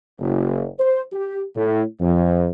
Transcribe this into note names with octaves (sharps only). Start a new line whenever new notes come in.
F#1
C5
G4
A2
F2